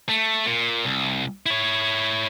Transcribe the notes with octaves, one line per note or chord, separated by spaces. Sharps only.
A3
A#2
C2
E4 C#5